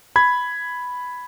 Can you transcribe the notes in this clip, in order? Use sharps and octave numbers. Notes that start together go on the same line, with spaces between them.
B5 G#6